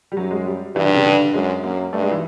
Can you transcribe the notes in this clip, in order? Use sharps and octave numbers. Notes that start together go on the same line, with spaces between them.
G3
F#2 F#3
G#3
G3
G2 E3
D3
C#3
D3
F#2 G#3
F#2 A#3
G2 A3
G#3
E3